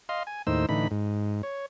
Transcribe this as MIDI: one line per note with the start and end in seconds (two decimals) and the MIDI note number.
0.09 0.23 75
0.09 0.23 77
0.09 0.23 84
0.27 0.42 80
0.47 0.66 39
0.47 0.66 45
0.47 0.66 63
0.47 0.66 72
0.47 0.66 88
0.69 0.88 45
0.69 0.88 50
0.69 0.88 52
0.69 0.88 63
0.69 0.88 83
0.91 1.42 44
1.43 1.66 73